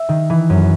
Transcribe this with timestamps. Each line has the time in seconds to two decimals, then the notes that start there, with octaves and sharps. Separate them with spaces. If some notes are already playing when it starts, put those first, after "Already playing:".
Already playing: E5
0.09 D#3
0.30 E3
0.50 F#2